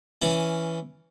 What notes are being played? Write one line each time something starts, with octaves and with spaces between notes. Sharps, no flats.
E3 C#4 D5